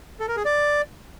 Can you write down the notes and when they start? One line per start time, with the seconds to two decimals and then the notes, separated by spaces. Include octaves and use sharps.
0.20 A4
0.28 A#4
0.37 G#4
0.45 D5